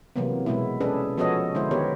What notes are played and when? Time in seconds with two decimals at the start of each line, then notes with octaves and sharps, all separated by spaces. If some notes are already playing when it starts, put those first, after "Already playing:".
0.16 C3 E3 F#3 A#3 B3
0.46 B2 G#3 B3 E4
0.81 C#4 D4 G#4 A4 B4
1.18 F3 B3 F#4 A4 C#5 D#5
1.55 D3 G#3 E4 C5
1.71 D#3 B3 G4 A#4 C#5